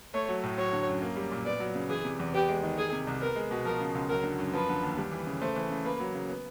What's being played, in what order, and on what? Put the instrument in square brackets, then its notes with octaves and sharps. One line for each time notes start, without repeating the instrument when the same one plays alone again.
[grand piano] A3 [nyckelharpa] C#5
[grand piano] F#3
A2
[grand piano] F#3 [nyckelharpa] C#5
[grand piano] D3
F#2
A#3
G3
A#2
[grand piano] B3 [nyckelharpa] D5
[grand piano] F#3
C#3
[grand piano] E3 [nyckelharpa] G#4
[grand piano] C3
E2
[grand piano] B3 [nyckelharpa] G4
[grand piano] G#3
D#3
[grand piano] D#3 [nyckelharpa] G#4
[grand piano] C3
C2
[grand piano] B3 [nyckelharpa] A#4
[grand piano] G#3
B2
[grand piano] F3 [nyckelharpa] A#4
[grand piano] C#3
C#2
[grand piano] F#3 [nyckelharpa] A#4
[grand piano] D3
F#2
[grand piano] F3 [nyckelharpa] B4
[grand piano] D3
D#2
G3
E3
C#3
[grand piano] A3 [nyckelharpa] C5
[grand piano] E3
C#3
[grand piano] A#3 [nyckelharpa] B4
[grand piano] F#3
C#3
B3